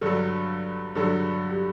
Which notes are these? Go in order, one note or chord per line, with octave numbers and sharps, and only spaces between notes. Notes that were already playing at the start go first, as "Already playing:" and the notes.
G2 D3 F#3 A4
G2 D3 F#3 A4
G4